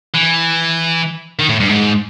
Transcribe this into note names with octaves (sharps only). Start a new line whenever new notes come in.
E3
D#3
A2
G2
G#2